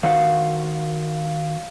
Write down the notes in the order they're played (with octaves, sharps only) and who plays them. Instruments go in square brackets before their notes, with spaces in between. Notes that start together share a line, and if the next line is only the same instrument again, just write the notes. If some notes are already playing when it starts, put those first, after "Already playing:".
[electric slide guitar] D#3 F#4 F#5 [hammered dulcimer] F5